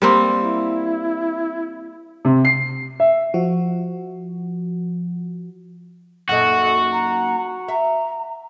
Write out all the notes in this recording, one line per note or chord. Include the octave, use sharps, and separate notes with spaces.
G3 A#3 C4
E4
C3
C7
E5
F3 F#4
F#2 A#2 D#4 F#4 A4
A#5
E5 A#5